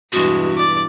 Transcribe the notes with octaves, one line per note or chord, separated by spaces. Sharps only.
E2 G2 B2 G#3 F#4
D5 D6